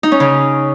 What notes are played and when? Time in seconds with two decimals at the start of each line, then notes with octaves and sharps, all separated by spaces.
0.03 D#4
0.12 C#4
0.20 C#3